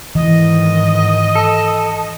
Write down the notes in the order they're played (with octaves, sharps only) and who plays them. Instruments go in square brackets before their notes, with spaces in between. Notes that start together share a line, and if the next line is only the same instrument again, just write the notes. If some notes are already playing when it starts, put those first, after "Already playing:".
[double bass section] G#2 D#3 [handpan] E3 [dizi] D#5
[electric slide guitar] A4